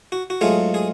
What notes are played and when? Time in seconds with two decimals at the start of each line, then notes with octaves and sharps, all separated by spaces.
0.12 F#4
0.30 F#4
0.41 G#2 F#3 A3 F4 G#4
0.74 G#4